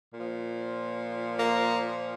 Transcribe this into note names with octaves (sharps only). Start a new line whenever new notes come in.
A#2
F3
A#3